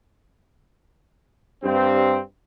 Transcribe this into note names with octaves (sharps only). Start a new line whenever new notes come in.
G2 C4